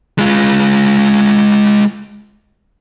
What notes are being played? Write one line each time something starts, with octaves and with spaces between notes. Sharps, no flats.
G#3 F4